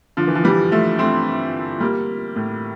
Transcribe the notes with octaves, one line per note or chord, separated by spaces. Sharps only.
D3 F3
E3
F3
E3 G3
F3 A3
A3 C4
G3 A#3
A2